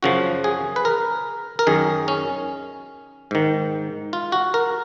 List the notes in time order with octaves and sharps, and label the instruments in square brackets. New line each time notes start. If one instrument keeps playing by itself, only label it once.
[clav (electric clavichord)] F#2 C#3 F3 F#4
G#4
B4
A#4
A#4
F#2 D#3 G#4
C#4
G#2 D#3
F4
F#4
A#4